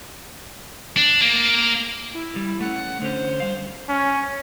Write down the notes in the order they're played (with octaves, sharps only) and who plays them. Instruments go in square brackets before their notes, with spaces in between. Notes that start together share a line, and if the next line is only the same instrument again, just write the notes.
[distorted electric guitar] D4
A#3
[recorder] E4
[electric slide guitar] G3
[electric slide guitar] A3 C#4 [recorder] F#5
[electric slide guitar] D3 C#4 [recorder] C5
[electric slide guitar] G3 F5
[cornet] C#4